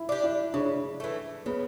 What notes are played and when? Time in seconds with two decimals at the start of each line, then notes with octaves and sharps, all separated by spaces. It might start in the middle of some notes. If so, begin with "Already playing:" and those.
Already playing: E4
0.09 D4 G4
0.24 E4
0.54 C#3 D4
1.00 E3 A3
1.46 C#3 B3